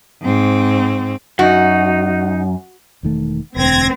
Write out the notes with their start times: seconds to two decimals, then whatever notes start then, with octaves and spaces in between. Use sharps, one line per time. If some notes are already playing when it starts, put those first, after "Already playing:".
0.22 G#2 C4
1.39 F#2 D#4 F#4
3.03 E1 D#3 A3
3.56 E1 D2 C4 G#6 A#6